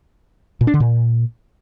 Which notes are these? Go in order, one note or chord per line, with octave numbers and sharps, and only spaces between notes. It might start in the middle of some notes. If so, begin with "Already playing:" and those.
A#2
D4
D3
A#2